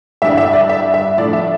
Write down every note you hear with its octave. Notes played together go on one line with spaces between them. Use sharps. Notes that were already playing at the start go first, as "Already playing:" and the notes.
G2 E3 G3 D4 E5
E5
D5
E5
E5
A2 F3 A3 D4 D5
E5